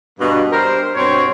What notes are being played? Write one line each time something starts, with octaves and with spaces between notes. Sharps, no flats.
G2 B2 A#3
G3 A#4 C5
G2 B2 C4 C#5